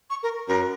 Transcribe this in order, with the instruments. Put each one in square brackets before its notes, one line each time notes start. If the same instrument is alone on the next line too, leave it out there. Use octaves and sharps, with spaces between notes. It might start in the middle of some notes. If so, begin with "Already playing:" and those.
[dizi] C#6
A#4
[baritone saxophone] F#2 [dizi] A#4